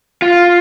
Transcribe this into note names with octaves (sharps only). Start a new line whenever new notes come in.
F4